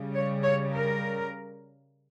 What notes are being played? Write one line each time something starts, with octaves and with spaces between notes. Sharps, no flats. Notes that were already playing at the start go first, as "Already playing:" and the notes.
Already playing: C#3 G3
C#5
C#5
A#4